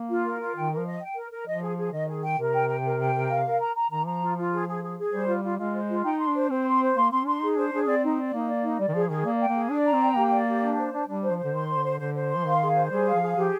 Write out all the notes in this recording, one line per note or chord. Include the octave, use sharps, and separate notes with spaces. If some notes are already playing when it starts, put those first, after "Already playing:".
Already playing: A#3
F4
A#4
F4
D#3 G5
A#4
F3
D#5
G5
A#4
A#4
F3 D#5
G#4
G#4
D#3 D#5
G#4
G5
C3 A#4
G5
G5
A#4
G5
A#4
F5
A#4
A#5
A#5
D#3 A#5
F3 A#5
F4
F4
G#4
G#4
G#4
G#4
G3 C5
F4
F4
G#3 F4
C5
F4
D#4 G5
C6
D4
C5
C4 C5
C6
C5
A#3 C6
C4 C6
D4 C6
D#4 G#4
D4 C5
D4 G#4
C4 D5
D#4
D5
A#3 D#4
D5
D#4
G3 D5
D#3
F3 G#4
D#3 G#4
A#3 D5
G5
A#3
G#4
D4 D5
A#5
C4
G5
A#3 G4
D5
G4
D4
C5
D4
G3 D4
C5
F3
C5
D3
D#3 C6
C5
D3
C5
D3 C5
C5
C6
F3
D#3 F5
G#4
C5
G3 G#4
F5
F3
G#4
F3 G4